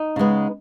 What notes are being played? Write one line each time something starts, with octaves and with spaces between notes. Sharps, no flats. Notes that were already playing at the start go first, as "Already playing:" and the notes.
Already playing: D#4
C#3 G#3 B3